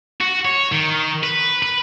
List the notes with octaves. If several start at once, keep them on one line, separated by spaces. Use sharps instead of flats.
F#4
C#5
D#3
B4
B4